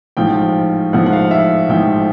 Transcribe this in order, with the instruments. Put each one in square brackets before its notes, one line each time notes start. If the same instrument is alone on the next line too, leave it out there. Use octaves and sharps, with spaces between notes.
[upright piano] A1 G#2 F3 G5
A1 G#2 F3 F#5
F#5
F5
E5
A1 G#2 F3 G5